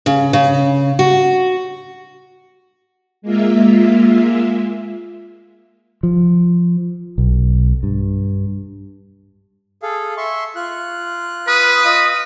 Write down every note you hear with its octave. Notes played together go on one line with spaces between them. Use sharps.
C#3
C#3
F#4
G#3 A#3 F4 E5
F3
B1
G2
G#4 A4 F5
E5 C6 C#6
F4 F#6
B4 D#6
F4 D#5